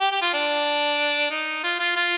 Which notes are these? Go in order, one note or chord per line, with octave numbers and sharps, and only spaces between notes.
G4
G4
F4
D4
D#4
F4
F4
F4